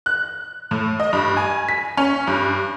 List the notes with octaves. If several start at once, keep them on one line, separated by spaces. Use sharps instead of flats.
F#6
A2
D#5
G2
G#5
B6
C#4
G2